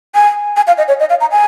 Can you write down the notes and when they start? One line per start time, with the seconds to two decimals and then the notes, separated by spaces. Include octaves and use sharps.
0.15 G#5
0.56 G#5
0.67 F5
0.78 D#5
0.88 C#5
1.00 D#5
1.10 F5
1.21 A#5
1.32 G#5